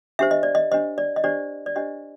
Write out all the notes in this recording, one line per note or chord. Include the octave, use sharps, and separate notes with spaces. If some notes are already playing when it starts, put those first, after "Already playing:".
D4 G4 C5 E5
D#5
D5
D#5
D4 G4 C5 D#5
D5
D#5
D4 G4 C5 D5
D5
D4 G4 C5 D#5